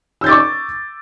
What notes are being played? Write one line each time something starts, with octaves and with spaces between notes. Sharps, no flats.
C#6 D6 E6 G6 A6